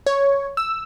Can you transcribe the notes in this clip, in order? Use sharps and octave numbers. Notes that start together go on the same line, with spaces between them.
C#5
E6